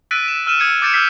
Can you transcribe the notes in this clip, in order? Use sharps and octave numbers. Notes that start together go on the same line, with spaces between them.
E6 F#6 A6 B6 D7 D#7
E7
E6 F6 D#7 E7
D#6 G#6 C#7
D6 G6 A6 C#7 D7 E7
E6 F6 G6 B6 C7